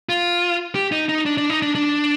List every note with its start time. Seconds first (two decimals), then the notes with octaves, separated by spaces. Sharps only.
0.09 F4
0.75 G4
0.92 D#4
1.09 D#4
1.26 D4
1.38 D4
1.50 D#4
1.62 D4
1.75 D4